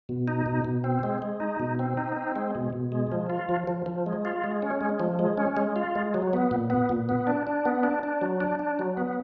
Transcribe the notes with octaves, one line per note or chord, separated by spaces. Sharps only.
B2
D#4
B2
B2
C4
G#3
G#3
D#4
B2
C4
D#4
C4
G#3
B2
B2
G#3
F3
F4
F3
F3
F3
G#3
F4
G#3
C#4
G#3
F3
G#3
C#4
G#3
F4
G#3
F#3
B3
A#2
B3
A#2
B3
D4
D4
B3
D4
D4
F#3
D4
D4
F#3
B3